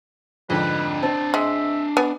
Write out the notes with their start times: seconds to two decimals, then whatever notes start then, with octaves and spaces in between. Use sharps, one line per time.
0.50 F2 G#2 D3 D4 B4 D#5
1.03 C4 A5
1.34 G#3 E5
1.97 B3 G#5